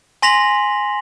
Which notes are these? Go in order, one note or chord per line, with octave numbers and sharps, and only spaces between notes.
G#5 C6 A#6 B6 F7 F#7